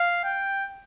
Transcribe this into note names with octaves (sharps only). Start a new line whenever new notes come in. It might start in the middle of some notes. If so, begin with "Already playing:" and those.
Already playing: F5
G5